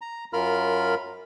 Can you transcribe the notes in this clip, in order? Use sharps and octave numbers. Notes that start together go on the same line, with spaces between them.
A#5
F#2 F4 A#4 B5 F6